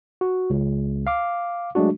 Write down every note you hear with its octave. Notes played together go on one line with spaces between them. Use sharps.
F#4
C#2
F5 D6
F#3 G#3 A3 D4 F#4